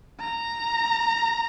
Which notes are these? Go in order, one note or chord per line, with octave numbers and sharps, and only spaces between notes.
A#5